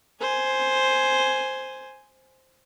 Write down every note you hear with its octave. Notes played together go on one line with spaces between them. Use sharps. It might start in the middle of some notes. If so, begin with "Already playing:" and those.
C5 G#5